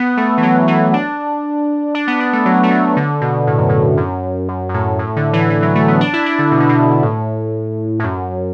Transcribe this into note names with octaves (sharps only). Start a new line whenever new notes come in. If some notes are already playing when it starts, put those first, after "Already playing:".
Already playing: B3
A3
E3
F#3
E3
D4
D4
B3
D4
A3
F#3
A3
F#3
D3
B2
A2
F#2
A2
F#2
F#2
F#2
A2
A2
D3
E3
E3
F#3
A3
B3
D4
E4
D4
D3
B2
D3
B2
A2
A2
F#2